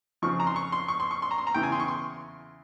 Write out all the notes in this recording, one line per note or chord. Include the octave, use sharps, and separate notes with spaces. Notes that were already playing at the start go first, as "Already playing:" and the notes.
F2 C#3 F3 C#6
A#5
C6
C#6
C6
C#6
C6
C#6
C6
A#5
C6
A#5
E2 C#3 E3 G5
G#5
C6
C#6
C6